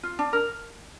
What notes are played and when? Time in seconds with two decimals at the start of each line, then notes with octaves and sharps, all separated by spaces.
0.03 F4
0.19 D4
0.33 A#4